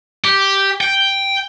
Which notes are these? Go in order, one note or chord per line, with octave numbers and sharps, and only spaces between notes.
G4
G5